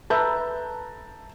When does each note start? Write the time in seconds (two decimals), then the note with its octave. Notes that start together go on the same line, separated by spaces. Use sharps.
0.10 A4 B4 E5 A5 A#5 G6